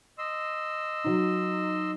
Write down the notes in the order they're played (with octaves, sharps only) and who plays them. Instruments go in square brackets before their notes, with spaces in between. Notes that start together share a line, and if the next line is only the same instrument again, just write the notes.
[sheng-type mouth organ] D#5 C6 E6
[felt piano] F#3 D#4